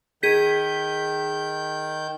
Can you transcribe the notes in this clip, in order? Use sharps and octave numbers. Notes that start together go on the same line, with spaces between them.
D#3 G#4 G6 B6